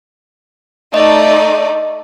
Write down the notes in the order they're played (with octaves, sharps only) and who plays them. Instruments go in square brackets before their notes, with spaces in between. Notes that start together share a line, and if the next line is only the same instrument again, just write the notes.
[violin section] A3 D#4 D5 [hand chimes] D#5